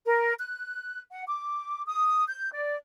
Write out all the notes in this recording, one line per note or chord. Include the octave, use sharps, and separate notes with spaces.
A#4
F#6
F#5
D6
D#6
G6
D5